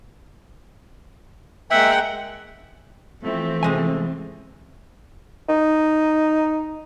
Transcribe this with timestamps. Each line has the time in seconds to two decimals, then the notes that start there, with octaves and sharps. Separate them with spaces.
1.71 G#3 A#3 E5 F#5 G5
3.23 E3 F3 A3 C4
3.63 C3 G#3 G#5
5.49 D#4